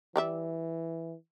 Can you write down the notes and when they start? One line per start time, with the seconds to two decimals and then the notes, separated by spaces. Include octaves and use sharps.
0.16 E3 G3 D5 E5